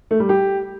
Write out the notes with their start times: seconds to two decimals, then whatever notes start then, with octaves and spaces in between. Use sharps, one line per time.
0.11 A3
0.20 G3
0.29 G4